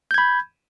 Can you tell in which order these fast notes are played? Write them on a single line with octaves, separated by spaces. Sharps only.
G6 G#6 B5